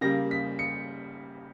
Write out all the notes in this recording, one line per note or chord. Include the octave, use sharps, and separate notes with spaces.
C#3 G3 A#3 A#6
B6
C#7